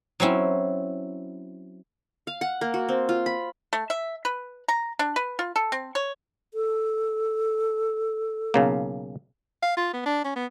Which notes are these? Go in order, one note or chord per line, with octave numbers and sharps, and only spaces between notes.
F#3 C4 C#4 E4
F5
F#5
A#3
F#4
C4
F4
B5
A3
E5
B4
A#5
D4
B4
F4
A4
C4
C#5
A4
B1 C#3 A#3
F5
F4
B3
D4
C#4
B3